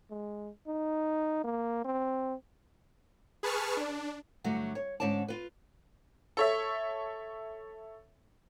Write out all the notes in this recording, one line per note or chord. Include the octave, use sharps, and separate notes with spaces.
G#3
D#4
A#3
C4
G#4 B4 A5 C#6 F6
D4
G2 D3 F#3 A3
C#5
G#2 D3 C#4 D5 A5
F4 B4
A4 C#5 E5